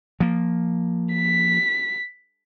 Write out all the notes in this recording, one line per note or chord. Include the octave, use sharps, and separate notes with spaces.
F3 A#3
B6